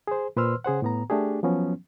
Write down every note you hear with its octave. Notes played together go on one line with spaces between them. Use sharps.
G#4 C5
A#2 B4 C5 C6 E6 F6
C#3 G#4 C5 F#5
A2 B3 A#5
A3 D4 G4 G#4
F3 F#3 B3 C#4